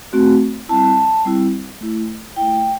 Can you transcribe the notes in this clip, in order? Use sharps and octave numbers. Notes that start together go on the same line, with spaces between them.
A3 C4 F#4
G3 C4 E4 A5
G3 C4 E4
A3 E4
A3 E4 G5